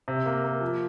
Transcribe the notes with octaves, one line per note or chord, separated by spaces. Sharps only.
C3
A#3
A#3
F3